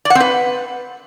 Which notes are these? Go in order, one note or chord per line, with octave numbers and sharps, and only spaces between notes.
D5
F#5
C4
B4